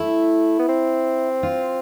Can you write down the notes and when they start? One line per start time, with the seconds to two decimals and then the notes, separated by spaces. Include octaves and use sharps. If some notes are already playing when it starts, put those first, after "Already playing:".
Already playing: A3 E4
0.59 B3
0.68 C4
1.43 F4